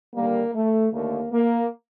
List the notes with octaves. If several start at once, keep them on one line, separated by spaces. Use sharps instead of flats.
D#2 D3 G3 A#3
A3
D#2 D3 A3 A#3
A#3